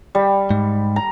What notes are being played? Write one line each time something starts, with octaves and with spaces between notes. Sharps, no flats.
G3
G#2
A#5